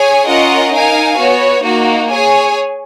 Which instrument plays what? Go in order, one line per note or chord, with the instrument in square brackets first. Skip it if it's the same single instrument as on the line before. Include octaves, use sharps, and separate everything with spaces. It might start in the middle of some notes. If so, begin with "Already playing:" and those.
Already playing: [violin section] G#4 C#5 G#5
C#4 F4 A#4 D#5 F#5
D#4 A#4 F5 G#5
B3 F#4 C#5
A#3 D#4 F#4
G#4 C#5 G#5